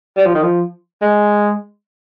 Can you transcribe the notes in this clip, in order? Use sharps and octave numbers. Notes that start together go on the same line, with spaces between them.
G3
F3
D#3
F3
G#3